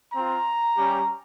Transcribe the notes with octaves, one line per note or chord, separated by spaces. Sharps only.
C4 F4 A#5
G3 C#4 G4